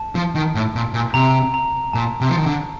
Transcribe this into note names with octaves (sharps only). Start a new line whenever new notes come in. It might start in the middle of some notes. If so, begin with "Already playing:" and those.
Already playing: A5
F3
D#3
A2
A#2
A#2
C3 A#5
A#5
A#2 A5
C3
F3
D#3
D3